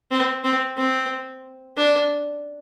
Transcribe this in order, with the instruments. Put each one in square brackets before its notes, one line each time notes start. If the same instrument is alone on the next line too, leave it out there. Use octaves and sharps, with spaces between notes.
[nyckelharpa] C4
C4
C4
D4